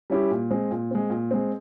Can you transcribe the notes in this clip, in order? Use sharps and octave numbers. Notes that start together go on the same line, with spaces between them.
G3 C#4 E4 G4
A#2
G#3 C4
A#2
G#3 C4
A#2
G#3 C4